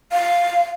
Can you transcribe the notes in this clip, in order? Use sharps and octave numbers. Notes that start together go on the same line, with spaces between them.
F5